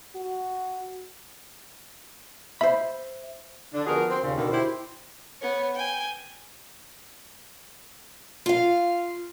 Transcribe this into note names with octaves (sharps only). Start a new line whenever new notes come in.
F#4
C5 E5 B5
D3 D4
D3 F3 B3 F#4 G#4 A#4
C4
D#2 A#2 C#3
B2 D3 D#3
E4 G4 C5
B3 C#5
G5 G#5
F4 F5